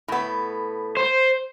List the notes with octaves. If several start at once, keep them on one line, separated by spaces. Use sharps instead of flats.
A2 B3
C5